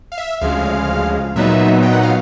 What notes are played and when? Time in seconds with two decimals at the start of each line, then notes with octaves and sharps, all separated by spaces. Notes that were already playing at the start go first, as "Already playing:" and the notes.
0.12 F5
0.18 E5
0.41 D2 C#3 F3 G#3 F5
1.36 A#2 F#3 B3 D#4 E5
1.83 G5
1.93 F#5
2.03 F5